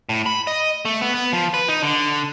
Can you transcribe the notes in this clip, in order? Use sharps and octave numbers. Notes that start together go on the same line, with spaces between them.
A2
B5
D#5
A3
B3
B3
F3
B4
D#4
D3